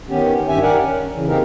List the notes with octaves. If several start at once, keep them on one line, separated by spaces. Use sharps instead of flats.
D#3 B3 C#4 G4
G2 D#3 G4 E5 G#5
G4 A#4 D5 F#5 G#5
C#4
C#3 E3
A#3 C4 D#4 G4 G#4 A#4